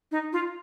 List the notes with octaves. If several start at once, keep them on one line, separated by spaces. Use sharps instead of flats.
D#4
F4